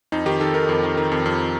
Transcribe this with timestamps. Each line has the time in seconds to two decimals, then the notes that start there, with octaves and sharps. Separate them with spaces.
0.12 F2 D#4
0.26 D#3 G4
0.41 D#3 A4
0.54 D#3 A#4
0.69 F2
0.83 D#3
0.97 D#3
1.12 F2
1.26 F2